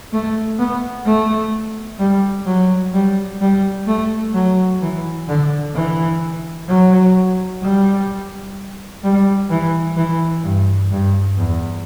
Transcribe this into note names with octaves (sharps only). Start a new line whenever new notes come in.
A3
B3
A3
G3
F#3
G3
G3
A3
F#3
E3
D3
E3
F#3
G3
G3
E3
E3
G2
G2
E2